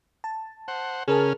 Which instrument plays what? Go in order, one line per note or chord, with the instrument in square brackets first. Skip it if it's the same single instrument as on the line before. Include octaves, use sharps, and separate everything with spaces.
[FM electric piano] A5
[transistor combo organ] C5 F#5
[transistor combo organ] C#3 C#4 F6 [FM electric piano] G#4 A#4 A5